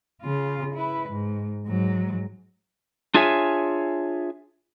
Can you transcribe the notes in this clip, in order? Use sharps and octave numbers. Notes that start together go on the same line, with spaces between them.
C#3 F4
E4 B4
G#2
G#2 F#3
D4 F4 G#4 C#5 E5 G#5